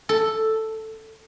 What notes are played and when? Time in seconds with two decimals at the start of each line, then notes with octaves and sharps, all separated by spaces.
0.09 A4